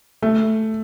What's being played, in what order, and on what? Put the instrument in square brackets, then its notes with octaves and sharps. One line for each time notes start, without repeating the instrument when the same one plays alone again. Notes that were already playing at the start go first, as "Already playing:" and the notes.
[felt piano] A3